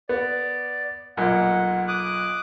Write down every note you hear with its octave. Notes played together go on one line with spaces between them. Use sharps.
B3 D5
B1 A#2 F#5
D6 D#6 F#6